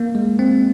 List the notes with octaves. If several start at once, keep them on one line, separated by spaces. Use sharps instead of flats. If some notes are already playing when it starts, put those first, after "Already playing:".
Already playing: A#3
G#3
C4